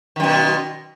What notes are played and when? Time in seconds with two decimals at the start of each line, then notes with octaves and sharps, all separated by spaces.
0.16 D#3
0.20 F#2
0.24 B2